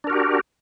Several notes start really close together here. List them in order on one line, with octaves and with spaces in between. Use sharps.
D4 A#4 F#4 G4